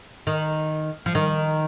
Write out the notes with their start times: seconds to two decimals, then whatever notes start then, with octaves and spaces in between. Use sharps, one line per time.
0.27 D#3
1.06 F3
1.15 D#3